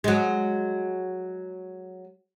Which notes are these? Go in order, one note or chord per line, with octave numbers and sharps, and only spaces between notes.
F#3 G#3